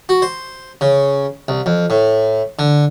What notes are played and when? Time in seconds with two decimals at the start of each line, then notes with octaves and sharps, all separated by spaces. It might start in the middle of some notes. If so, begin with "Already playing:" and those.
0.09 F#4
0.22 C5
0.81 C#3
1.48 C2
1.66 F2
1.90 A2
2.59 D3